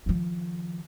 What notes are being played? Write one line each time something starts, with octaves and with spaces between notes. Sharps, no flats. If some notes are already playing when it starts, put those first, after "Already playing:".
D#3 F3